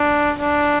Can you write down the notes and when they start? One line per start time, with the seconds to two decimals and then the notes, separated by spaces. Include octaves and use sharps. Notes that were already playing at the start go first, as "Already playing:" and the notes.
Already playing: D4
0.40 D4